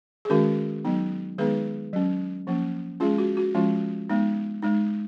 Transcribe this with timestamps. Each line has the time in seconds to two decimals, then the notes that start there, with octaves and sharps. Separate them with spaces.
0.25 G#4
0.30 D#3 G#3 C#4 F#4 A#4
0.85 F#3 B3 D#4
1.38 D#3 G#3 B3 D#4 G#4 B4
1.93 F#3 C#4
2.47 F3 A#3 C#4
3.00 G#3 C#4 F4 G#4
3.18 F#4
3.37 F#4
3.54 F3 G#3 C#4 F4
4.10 G#3 B3 D#4
4.62 G#3 D#4